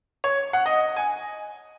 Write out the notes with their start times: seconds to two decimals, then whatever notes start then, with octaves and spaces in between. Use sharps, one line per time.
0.24 C#5
0.53 F#5
0.66 D#5
0.96 G#5